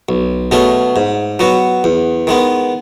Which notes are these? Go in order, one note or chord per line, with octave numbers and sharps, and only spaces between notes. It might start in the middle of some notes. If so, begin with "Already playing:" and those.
B1
B2 A3 C#4 G#4
G#2
F#3 B3 F#4
E2
D#3 G#3 B3